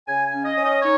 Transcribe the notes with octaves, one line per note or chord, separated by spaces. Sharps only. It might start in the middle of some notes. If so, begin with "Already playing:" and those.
C#3 G#5
G#5
C#4
D#5
C#4
D#5
D#4 C#5